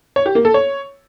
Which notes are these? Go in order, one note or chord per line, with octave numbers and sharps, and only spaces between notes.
C#5
G4
A#3
A4
C#5